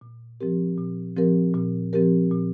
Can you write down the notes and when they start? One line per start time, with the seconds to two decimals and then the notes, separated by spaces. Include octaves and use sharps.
0.01 A#2
0.41 F3 C4 G4 A#4
0.78 A#2
1.16 F3 C4 G4 A#4
1.54 A#2
1.93 F3 C4 G4 A#4
2.31 A#2